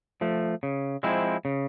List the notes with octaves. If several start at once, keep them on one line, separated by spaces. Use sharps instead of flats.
F3 A3
C#3
F3 G#3 C4 E4
C#3